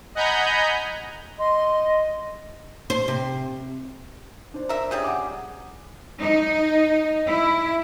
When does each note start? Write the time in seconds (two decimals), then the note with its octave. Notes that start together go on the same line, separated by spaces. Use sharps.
0.15 D#5 F#5 G#5 A#5 B5 G6
1.38 D#5 C6
2.90 C5
3.08 C3
4.54 D4 C5
4.69 A#4 E5
4.91 C#3 G3 G#4
5.04 F#5 D6
6.20 D#4
7.26 E4